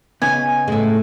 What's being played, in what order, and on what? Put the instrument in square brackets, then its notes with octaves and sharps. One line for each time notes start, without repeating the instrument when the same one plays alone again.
[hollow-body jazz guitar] C#3 B3 D#4 [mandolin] G#5
[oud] A2 G#3 [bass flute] A3